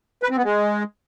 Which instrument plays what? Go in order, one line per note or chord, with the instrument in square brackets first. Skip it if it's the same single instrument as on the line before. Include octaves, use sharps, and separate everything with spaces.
[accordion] B4
C4
B3
G#3